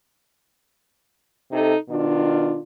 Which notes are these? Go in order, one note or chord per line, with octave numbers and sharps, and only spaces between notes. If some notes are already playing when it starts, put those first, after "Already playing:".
C3 D#4 A4
B2 D#3 D4 F4